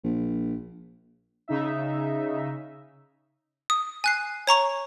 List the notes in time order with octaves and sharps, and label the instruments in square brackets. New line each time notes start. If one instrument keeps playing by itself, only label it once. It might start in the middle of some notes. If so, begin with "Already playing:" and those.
[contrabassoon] A#1
[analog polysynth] C#3 D#4 E5
[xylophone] D#6
G#5 F#6 C7
C#5 A#5 C#6 F7